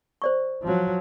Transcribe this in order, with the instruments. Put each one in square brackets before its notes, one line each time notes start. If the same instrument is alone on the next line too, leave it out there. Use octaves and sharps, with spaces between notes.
[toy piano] C5 D5 C#6
[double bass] F3 F#3